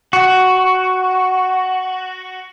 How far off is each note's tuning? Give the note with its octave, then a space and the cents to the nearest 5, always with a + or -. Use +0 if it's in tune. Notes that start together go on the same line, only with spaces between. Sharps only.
F#4 +5